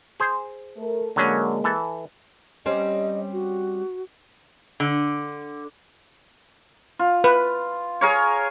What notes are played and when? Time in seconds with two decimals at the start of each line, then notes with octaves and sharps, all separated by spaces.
0.20 G#4 C5
0.77 A3 A#4
1.16 D3 F#3 G#3 A#3 C#4
1.64 E3 A4
2.66 G3 C4 C#4 D#5
3.33 F#4
4.80 D3
6.99 F4
7.24 B4
8.01 G#4 A#4 C#5